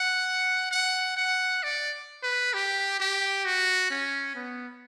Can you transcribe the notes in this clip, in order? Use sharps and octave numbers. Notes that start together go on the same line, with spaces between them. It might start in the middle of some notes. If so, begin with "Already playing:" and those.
Already playing: F#5
F#5
F#5
D5
B4
G4
G4
F#4
C#4
B3